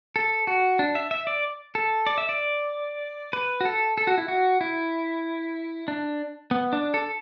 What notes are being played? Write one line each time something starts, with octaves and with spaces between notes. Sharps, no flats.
A4
F#4
D4
E5
E5
D5
A4
D5
E5
D5
B4
F#4
A4
A4
F#4
E4
F#4
E4
D4
B3
D4
A4